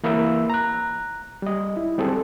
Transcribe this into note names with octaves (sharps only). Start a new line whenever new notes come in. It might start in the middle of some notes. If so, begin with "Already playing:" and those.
E3 A#3 E5 B5 E6
A#5 F#6
G3 D#5
E4
G3 C4 G#4 A4